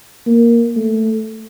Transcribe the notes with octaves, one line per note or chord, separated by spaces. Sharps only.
A#3
A3